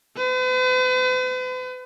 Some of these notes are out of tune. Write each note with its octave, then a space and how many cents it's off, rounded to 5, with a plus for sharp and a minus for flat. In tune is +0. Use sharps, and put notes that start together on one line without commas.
B4 +45